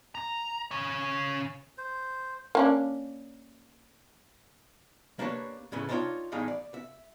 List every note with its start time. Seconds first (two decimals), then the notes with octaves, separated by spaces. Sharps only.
0.15 A#5
0.71 C#3 C#5
1.78 C5
2.55 A#3 C#4 D4
5.19 A#3 D4 G4 B4 C#5
5.72 A2 C#3 E3 A3
5.89 D4 D#4 F4 G#4 C#5 G5
6.32 E2 A2 G3 D#4 G#4 F5
6.48 D5
6.74 E5